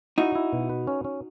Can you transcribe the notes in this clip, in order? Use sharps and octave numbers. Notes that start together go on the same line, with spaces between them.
D#4 E4 F#4
E4
B2
B4
C#4
C#4